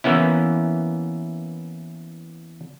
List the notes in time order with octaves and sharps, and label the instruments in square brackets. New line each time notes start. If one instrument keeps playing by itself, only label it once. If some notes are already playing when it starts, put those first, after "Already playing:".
[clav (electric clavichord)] E3 A#3 B3 C#4 E4